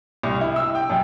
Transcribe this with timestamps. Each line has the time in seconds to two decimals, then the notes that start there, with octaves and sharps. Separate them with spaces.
0.23 C2
0.41 E4
0.56 E6
0.75 G5
0.90 F#2